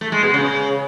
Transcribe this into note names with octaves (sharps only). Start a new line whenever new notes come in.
A3
G#3
B2
C#3